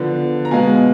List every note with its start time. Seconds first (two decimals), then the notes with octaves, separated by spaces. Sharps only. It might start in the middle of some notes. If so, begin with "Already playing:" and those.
Already playing: D3 F3 B3
0.45 A#5
0.51 B2 G#3 B3 F5 G#5